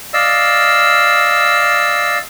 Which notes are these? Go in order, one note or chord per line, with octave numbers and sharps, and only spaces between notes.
D5 D#5 F5 E6